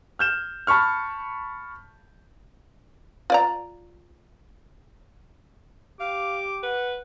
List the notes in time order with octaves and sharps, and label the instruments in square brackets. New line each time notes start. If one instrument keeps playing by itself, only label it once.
[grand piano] F6 G6 E7
A5 B5 C#6 F6
[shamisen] F4 D5 A#5
[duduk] G4 [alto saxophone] F5 [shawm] D6
[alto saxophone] B4 [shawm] F#5